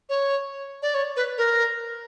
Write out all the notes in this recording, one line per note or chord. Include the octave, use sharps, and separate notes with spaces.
C#5
D5
C#5
B4
A#4